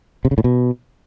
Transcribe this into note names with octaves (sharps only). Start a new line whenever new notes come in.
C3
C#3
A2
B2